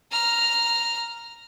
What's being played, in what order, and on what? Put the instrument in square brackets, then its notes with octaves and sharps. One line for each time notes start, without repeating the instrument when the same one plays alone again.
[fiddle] A#5 F6